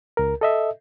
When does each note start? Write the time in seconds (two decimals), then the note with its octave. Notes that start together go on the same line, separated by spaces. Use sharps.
0.17 C#2 A#4
0.41 A4 D#5 E5